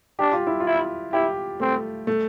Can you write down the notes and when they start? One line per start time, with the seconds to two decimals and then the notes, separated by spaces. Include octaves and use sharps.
0.19 D4 G4
0.33 F4
0.47 E4
0.60 F4
0.66 E4
1.13 E4 G4
1.60 A3 C4
2.07 A3